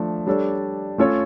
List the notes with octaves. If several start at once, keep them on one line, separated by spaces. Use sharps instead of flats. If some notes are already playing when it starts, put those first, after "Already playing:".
Already playing: F3 A3 D4
G3 D4 A4 C#5
A3 C#4 F4 A4 C#5